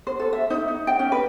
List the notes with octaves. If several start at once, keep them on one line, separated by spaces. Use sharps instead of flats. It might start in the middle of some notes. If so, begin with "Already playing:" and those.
C5
A4
E5
D#4
D#4
G5
C#4
B4